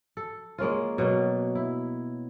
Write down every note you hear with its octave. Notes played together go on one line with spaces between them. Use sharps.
A4
G#3 A#3 C#4 F4
B2 F#3 A#3
E4